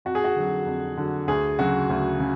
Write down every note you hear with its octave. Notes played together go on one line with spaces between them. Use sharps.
F2 F#4
G#4
F#4
D3 F#3
F2
D3 F#3
D2 G#4
C#3 F#3 F#4
D2
C#3